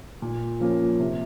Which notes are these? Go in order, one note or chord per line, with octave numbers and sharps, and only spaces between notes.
A#2
F3 A#3 C#4
C3